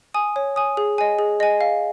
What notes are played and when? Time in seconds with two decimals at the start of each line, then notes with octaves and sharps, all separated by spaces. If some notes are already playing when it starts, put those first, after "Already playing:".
0.14 G#5 D#6
0.36 C#5
0.56 G#5 D#6
0.77 G#4
0.98 D#5 G#5
1.19 G#4
1.40 D#5 G#5
1.61 F5